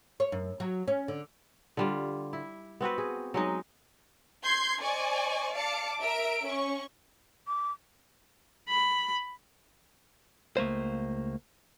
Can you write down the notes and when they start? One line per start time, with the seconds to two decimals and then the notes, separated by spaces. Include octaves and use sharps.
0.20 C#5
0.32 F#2
0.60 F#3
0.88 C#4
1.08 D3
1.77 D3 G3 F4
2.33 E4
2.81 B3 C4 F#4 B4
2.98 G#4
3.34 F#3 G#3 D#4
4.44 C6 G6 G#6 C7
4.83 C5 D5 D#5 G#5 C#6
5.55 D5 F5 A5 D6 C#7
5.99 A#4 E5 D7
6.47 C#4 C#6
7.47 D6
8.69 B5
10.57 C#2 A3 A#3 C5